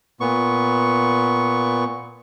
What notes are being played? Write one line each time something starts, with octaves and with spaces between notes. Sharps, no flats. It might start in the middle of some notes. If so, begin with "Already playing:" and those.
A#2 B3 C#6